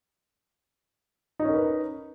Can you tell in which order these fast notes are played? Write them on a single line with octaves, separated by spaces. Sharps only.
D#4 C#4 A#4 B4